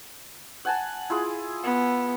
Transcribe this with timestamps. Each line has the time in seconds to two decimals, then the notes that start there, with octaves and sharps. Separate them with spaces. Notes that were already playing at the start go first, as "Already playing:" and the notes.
0.65 F#5 G#5 A5
1.10 E4 F4 G#4
1.64 B3